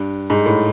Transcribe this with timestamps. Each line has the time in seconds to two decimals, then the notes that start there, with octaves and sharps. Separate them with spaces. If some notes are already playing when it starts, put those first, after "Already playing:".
Already playing: G2
0.30 G#2
0.46 A2